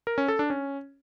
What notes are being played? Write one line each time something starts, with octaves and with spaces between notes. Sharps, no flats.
A#4
C#4
A4
D4
C#4